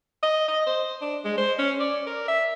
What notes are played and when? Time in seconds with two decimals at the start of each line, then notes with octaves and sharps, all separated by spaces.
0.23 D#5
0.48 D#5
0.66 C5
1.01 D4
1.24 G#3
1.38 C5
1.59 C#4
1.79 D5
2.07 A#4
2.28 E5